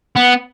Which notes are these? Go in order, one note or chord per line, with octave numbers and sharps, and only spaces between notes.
B3